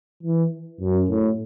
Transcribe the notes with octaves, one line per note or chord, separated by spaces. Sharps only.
E3
F#2
A2